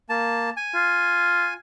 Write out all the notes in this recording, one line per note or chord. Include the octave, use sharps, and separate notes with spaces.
A#3 A5
G#5
F4